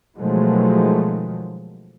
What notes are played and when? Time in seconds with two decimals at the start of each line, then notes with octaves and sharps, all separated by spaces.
0.17 B2 D#3 F3 F#3 G#3 A3